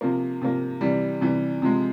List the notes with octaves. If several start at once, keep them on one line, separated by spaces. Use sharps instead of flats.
C3 F3 A#3
C3 F3 A#3
C3 E3 G3
C3 E3 G3
C3 F3 G#3